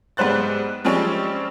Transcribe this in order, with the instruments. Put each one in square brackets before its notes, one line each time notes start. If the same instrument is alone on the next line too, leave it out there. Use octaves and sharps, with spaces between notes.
[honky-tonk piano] G#2 G3 B3 C5 F#6 A6
F3 G3 G#3 C4 C#4